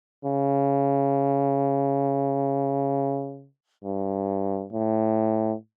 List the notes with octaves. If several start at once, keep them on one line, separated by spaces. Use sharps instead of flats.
C#3
G2
A2